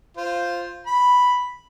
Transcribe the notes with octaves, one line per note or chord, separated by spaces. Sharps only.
F4 C5
B5